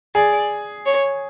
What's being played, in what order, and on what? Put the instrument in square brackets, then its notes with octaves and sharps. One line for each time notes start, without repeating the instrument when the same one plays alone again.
[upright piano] G#4 [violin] D5
[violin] C#5